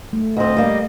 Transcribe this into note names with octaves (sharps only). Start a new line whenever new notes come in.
A3
D2 C4 D#5
G3 A3 A#3